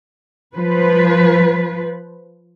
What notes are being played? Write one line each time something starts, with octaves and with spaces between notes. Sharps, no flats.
F3 B4